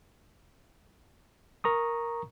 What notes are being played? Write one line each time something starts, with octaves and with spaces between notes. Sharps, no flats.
A#4 A#5 C#6 D#6